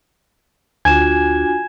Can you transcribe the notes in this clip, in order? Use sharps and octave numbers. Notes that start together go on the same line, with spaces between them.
D2 D4 F4 F#4 G#5 G#6 E7